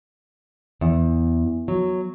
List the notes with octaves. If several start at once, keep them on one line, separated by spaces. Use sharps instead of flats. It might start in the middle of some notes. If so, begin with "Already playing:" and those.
E2
F#3